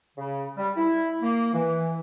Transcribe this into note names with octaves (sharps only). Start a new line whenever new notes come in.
C#3
G3
E4
A#3
E3